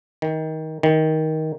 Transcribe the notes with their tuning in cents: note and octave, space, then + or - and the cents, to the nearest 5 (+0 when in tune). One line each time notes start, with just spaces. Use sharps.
D#3 +20
D#3 +15